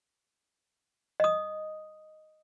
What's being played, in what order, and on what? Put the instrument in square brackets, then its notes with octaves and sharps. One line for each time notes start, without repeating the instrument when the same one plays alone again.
[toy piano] D#5 D#6